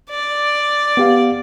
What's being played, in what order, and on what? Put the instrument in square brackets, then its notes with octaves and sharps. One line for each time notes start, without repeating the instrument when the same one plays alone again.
[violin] D5
[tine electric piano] B3 G4 F5